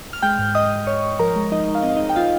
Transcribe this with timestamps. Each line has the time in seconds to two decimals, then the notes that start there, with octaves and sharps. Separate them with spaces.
0.13 F6
0.23 G#3 G5 G6
0.39 G#2
0.55 G#2 D#5 D#6
0.71 G#2
0.87 G#2 C#5 C#6
1.03 G#2
1.19 F3 A#4 A#5
1.36 G#3
1.52 F3 D#4 D#5
1.68 G#3 D#5
1.75 F5
1.82 C4 D#5
1.89 F5
1.97 D#4 D#5
2.00 G#3
2.10 G5
2.16 C4 F4 F5